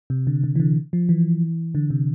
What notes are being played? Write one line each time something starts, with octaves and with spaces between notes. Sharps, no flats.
C3
D3
D3
E3
D3
F3
E3
D3
C3